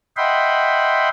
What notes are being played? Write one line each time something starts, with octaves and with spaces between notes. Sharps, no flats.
D#5 E5 F#5 G5 B5 C6